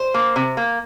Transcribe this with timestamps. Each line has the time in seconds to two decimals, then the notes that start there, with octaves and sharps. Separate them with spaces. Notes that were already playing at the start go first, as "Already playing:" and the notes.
Already playing: C5
0.14 A#3
0.36 C3
0.57 A#3